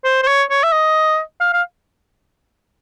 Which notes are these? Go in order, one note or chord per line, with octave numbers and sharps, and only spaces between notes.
C5
C5
C#5
C#5
E5
D#5
F5
F5